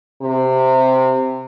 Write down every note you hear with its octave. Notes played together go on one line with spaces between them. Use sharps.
C3